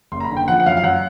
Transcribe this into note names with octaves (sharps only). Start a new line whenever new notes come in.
F#1 C6
A#5
B5
D3
G5
F3 F#5
F#5
F#2 F5
F5
F#2 F#5